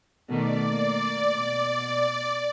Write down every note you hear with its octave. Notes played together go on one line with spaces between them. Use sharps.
B2 D#3 A3 D5
A#3
B2